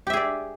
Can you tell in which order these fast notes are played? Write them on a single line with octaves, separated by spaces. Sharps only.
G4 E5 G#4 D5